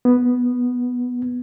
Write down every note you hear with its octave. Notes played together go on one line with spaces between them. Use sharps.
B3